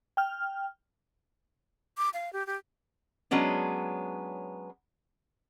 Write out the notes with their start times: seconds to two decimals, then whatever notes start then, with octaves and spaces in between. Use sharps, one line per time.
0.17 G5 F6
1.98 D6
2.14 F5
2.33 G4
2.47 G4
3.31 F#3 G#3 B3 C#4 D4